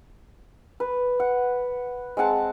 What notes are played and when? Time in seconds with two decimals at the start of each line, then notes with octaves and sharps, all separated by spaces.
0.80 B4
1.20 F#5
2.17 G#3 C4 F#5 A5